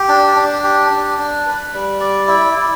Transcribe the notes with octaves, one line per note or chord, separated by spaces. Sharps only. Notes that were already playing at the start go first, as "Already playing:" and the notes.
Already playing: G4
D4
D4
G4
D4
D4
B4
G3
D5
E4
E4